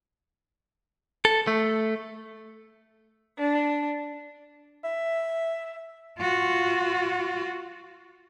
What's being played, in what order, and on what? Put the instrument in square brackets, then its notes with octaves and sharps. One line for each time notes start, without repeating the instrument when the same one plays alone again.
[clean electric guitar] A4
A3
[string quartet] D4
[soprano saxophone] E5
[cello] F4 F#4